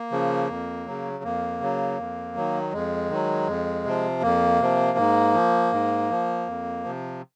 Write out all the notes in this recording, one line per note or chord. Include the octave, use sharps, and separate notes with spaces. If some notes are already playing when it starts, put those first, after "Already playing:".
Already playing: A#3
C#3 F3
F2
C#3 F#3
F2 A#3
C#3 F#3
F2
D#3 F#3
F2 G#3
D#3 F#3
F2
C3 F3
F2 A#3
C3 F3
G#2
F3
G#2
F3
F2
C3 F3